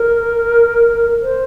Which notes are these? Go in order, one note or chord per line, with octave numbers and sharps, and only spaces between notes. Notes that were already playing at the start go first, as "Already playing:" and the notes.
Already playing: A#4
C5